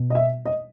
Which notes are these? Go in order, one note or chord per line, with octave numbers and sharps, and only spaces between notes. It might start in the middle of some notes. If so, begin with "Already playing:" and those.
Already playing: B2
D#5
E5
D#5